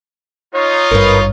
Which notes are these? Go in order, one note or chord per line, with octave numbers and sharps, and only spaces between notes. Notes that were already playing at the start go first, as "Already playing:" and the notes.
D#4 F4 C#5
G#1 G2 A#4 B4